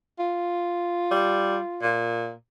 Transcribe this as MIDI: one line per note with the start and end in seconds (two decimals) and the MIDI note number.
0.19 2.06 65
1.11 1.58 55
1.82 2.32 46